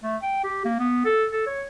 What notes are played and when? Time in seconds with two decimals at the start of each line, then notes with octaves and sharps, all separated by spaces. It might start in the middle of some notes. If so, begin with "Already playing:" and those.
0.03 A3
0.22 G5
0.44 G4
0.65 A#3
0.79 B3
1.05 A4
1.33 A4
1.47 C#5